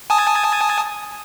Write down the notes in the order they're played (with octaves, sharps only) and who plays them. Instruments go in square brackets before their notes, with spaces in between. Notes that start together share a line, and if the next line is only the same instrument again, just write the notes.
[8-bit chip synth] G#5 A5 D#6